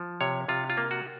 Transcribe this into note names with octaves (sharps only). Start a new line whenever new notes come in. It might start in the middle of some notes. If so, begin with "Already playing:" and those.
Already playing: F3
C3 C#5
C3 F4
F4
A#3
F#4